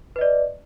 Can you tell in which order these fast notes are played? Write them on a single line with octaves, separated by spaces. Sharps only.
B4 D#5 D5